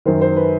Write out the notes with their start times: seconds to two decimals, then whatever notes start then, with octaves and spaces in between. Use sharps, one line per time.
0.06 F#2 D#3 C5
0.21 C5
0.37 B4